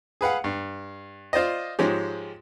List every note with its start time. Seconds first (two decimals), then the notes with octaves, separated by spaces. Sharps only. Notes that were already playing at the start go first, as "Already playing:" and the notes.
0.21 G#4 B4 F5 F#5
0.44 G2
1.33 F4 C5 D5 D#5
1.79 G#2 F3 G#3 C#4 G4